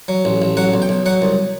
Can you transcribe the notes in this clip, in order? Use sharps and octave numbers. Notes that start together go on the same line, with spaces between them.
F#3
A1
A1
F#3 F#5
B1
G5
B1
F#3 F#5
C2